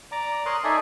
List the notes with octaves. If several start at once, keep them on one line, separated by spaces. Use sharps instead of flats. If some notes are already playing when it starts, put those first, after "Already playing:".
D5 A#5 D6
A#4 C#5 C6 D#6 F#6
D#4 A4 D5 E5 G#5 D#6